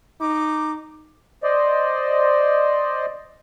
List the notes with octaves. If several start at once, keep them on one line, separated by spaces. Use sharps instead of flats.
D#4 D6
C5 D5 D#5